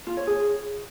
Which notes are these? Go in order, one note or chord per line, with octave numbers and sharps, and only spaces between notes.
F4
C#5
G#4